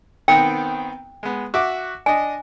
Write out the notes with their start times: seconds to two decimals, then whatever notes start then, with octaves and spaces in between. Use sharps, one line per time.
0.28 D#3 B3 C4 G5
1.23 G#3 B3
1.54 F#4 E5 D6
2.06 D4 D#5 G#5